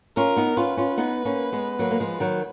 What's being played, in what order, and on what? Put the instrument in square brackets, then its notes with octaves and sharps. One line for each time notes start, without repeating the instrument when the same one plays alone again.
[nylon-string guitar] C#4 F4 [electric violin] A#4
[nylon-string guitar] B3 D#4
[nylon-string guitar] C#4 F4 [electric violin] B4
[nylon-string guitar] C#4 F4
B3 D#4
A#3 C#4
G#3 B3
F#3 A#3
A#3
F3 G#3
D#3 F#3